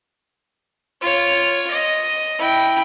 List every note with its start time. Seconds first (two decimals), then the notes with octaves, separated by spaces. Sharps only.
1.02 F4 C#5
1.71 D#5
2.39 E4 G5